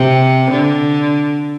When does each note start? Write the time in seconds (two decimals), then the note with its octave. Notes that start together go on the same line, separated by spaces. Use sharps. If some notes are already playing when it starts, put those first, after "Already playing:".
Already playing: C3
0.50 D3